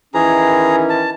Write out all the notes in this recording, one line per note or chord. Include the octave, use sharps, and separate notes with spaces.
D#3 E3 C#4 G#4 A#5
A5